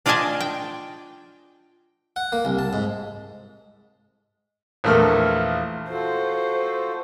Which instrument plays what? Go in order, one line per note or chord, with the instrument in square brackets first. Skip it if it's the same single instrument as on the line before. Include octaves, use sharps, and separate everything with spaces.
[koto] D4 F4 D5 D#5 G#5 A5
G5
[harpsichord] F#5
A#3
C2
A5
G#2
[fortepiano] A#1 E2 A3 A#4 F6
[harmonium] F4 F#4 A4 [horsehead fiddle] C5